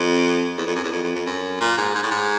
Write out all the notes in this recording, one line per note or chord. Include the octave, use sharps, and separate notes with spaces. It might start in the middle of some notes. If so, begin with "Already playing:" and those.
Already playing: F2
E2
F2
F#2
E2
F2
F2
F2
F#2
A#2
G#2
G#2
A2
G#2